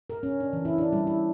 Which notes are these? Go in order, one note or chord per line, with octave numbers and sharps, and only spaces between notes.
A#4
C#4
D4
E3
E4
D4
G3
E4